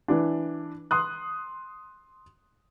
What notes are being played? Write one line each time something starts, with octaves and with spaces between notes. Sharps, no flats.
E3 D4
C6 D#6 F#6